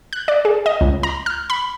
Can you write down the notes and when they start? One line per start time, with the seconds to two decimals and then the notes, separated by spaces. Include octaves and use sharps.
0.13 F#6
0.28 D5
0.45 G#4
0.66 D#5
0.81 C#2
1.03 A#5
1.26 F6
1.50 B5